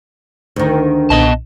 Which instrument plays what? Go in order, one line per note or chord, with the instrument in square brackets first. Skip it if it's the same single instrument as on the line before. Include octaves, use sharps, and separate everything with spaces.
[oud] D2 D#3
[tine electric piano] B1 A#2 [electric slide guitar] B3 D#5 A5